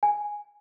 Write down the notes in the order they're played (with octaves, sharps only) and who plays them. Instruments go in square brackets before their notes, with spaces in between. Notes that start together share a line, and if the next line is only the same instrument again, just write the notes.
[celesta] G#5